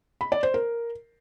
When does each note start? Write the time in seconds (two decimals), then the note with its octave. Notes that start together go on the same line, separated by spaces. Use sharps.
0.21 B5
0.32 D5
0.43 C5
0.54 A#4